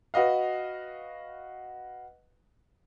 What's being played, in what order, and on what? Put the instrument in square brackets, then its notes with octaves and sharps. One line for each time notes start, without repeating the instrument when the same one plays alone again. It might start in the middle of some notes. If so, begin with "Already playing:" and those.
[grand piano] F#4 B4 D#5 F5